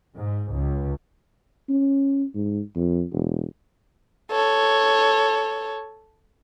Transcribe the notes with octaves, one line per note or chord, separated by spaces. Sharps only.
G#2
C#2
C#4
G#2
F2
E1
A4 C#5